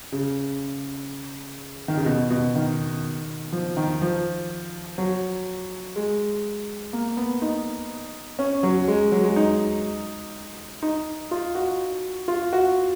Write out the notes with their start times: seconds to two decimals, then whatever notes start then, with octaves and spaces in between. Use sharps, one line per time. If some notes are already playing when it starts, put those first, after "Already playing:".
0.12 C#3
1.88 D#3
1.97 C#3
2.06 B2
2.30 B2
2.56 D#3
3.52 F3
3.77 D#3
4.02 F3
4.98 F#3
5.96 G#3
6.93 A#3
7.17 B3
7.42 D#4
8.39 C#4
8.63 F#3
8.88 G#3
9.12 F#3
9.24 G#3
9.36 D#4
10.83 D#4
11.31 F4
11.55 F#4
12.28 F4
12.53 F#4